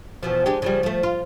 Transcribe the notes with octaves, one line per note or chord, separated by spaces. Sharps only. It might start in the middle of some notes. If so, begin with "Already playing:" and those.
E2 B2 F3
G#3 D4 G4
C#3 F3 G3
F3 A3
F4